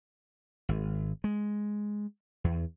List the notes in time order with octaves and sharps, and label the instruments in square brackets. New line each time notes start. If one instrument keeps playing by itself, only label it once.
[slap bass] G#1
G#3
E2